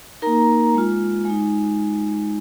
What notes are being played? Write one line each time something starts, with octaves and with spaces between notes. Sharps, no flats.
A#3 D#4 A#4 A#5
G#3 F4
G#3 D#4